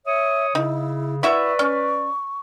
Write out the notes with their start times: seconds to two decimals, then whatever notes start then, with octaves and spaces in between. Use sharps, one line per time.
0.06 C#5 E5 D#6
0.55 C#3 D#4 E4
1.23 E4 F#4 B4 D5 E5 C#6
1.59 C#4